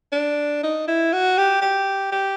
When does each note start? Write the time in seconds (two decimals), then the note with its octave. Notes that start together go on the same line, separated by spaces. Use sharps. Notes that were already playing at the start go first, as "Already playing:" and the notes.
0.12 D4
0.63 D#4
0.88 E4
1.13 F#4
1.38 G4
1.62 G4
2.12 G4